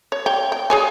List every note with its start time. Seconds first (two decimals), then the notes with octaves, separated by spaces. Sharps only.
0.12 C#5
0.26 C#5 G5
0.52 G5
0.70 G#4 C#5 G#5